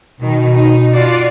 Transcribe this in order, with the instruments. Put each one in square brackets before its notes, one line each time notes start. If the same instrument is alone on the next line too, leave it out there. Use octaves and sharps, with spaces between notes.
[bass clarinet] B2 [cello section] D#3
[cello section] D#4
F4 F#4 D5